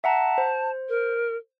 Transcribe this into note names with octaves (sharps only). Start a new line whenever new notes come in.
E5 F#5 A5 A#5
C5
A#4